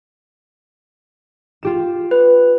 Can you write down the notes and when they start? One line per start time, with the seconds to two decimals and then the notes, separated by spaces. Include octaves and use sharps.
1.63 F4 G4 E7
2.11 B4